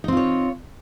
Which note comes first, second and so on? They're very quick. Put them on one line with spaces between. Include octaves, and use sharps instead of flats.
D#4 C4 F4 C#5